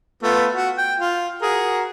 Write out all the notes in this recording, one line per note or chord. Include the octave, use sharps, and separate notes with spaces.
A3 B3 F4
F#4
G5
F4
F#4 G#4 A#4